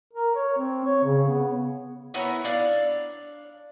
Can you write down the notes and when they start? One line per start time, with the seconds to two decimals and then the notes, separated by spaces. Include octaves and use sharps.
0.13 A#4
0.35 C#5
0.57 C4
0.85 C#5
1.04 C#3
1.28 B3
2.14 B3 E4 A#4 C#5
2.44 D4 D5 F5